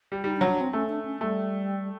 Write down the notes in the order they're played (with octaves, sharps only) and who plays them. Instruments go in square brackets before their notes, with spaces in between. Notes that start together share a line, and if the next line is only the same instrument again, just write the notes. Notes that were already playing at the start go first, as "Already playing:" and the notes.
[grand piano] G3
[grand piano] G3 [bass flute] D#4
[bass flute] D4
[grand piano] F#3
[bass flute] D4
C4
[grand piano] A3 [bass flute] C#4
[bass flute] D4
C#4
[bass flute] G3 [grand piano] A3